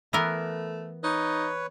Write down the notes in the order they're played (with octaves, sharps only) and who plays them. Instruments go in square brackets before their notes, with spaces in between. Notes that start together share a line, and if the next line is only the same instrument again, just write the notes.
[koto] E3 B3 A#4 [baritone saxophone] A3
[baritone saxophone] D#4 [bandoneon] B4 C#5